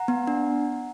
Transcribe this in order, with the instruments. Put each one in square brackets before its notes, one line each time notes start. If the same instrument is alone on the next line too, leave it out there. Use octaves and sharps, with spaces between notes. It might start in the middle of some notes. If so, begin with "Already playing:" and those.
Already playing: [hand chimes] F#5 A#5
B3
D4